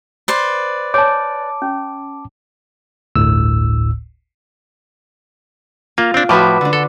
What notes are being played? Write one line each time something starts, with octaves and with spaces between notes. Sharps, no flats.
B4 C5 D5
C#5 G#5 A5 D6
C#4
G1 D2 A2 E6
A#3 F4
C4 D4
A2 F3 F#4 B4 D6
D3 D4
A4